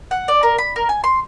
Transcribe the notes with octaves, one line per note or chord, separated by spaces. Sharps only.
F#5
D5
A#4
B5
A#4
G#5
C6